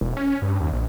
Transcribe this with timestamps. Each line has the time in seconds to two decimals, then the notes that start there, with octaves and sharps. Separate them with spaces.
0.01 E1
0.17 C#4
0.42 G2
0.60 D#2
0.73 A#1